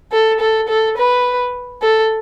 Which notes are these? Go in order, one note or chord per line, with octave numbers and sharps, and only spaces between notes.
A4
A4
A4
B4
A4